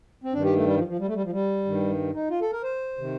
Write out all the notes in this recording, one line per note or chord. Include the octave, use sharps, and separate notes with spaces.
C4
G2 D#3 D4
G4
A3
G3
F3
F3
G3
A3
G3
F3
G3
G2 D#3
D#4
F4
A4
A#4
C5
C3 D#3